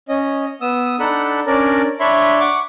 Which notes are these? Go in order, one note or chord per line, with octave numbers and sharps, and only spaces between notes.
C#4 D#5
B3 D#6 E6
D4 D#4 A4 F#5 B5
C#4 D4 A#4 D5
D4 C#5 E5 B5 C6
F#5 C#6 D6